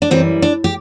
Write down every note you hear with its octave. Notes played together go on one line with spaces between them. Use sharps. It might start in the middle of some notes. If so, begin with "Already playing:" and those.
D4
F#2 E3 G3 C4
D4
G4